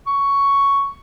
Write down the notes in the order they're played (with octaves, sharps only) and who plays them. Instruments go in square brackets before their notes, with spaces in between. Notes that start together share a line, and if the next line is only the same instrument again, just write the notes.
[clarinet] C#6